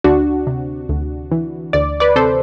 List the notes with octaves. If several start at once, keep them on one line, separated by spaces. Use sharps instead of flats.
D2 D4 F#4
C3
D2
E3
D2 D5
B4 D5
C3 A4 C5